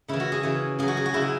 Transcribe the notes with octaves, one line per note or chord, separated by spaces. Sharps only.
C#3 E3 E4
F#4
G#4
C#3 E3
C#3 F#3 G#4
F#4
G#4
F#4
C#3 F#3 E4
F#4